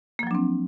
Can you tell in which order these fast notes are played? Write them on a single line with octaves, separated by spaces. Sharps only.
A#3 F3 F#3 D4 C4